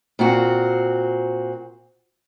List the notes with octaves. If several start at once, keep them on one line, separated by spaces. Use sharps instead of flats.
A#2 C4 F#4